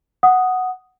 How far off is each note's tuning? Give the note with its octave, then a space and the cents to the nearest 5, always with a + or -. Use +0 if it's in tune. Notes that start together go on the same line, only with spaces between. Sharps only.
F#5 +0 D#6 +0